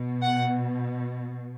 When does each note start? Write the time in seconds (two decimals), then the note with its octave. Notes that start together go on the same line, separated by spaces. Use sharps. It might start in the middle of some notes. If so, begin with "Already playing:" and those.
Already playing: B2
0.22 F#5